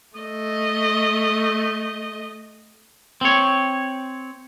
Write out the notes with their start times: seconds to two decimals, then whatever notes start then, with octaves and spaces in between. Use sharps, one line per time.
0.16 A3 D#5
3.21 C4 C#5